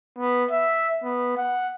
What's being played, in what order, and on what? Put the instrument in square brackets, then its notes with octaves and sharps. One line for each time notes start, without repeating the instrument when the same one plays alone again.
[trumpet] B3
E5
B3
F#5